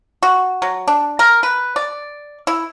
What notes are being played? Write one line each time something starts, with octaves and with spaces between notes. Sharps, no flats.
F#4
F#3
D4
A#4
B4
D5
E4